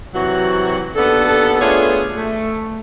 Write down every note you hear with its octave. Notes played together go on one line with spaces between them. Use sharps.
C3 E3 F#3 F#4
D#2 B3 D4 A4
A3 B3 D4 F4 G#4 C#5
A3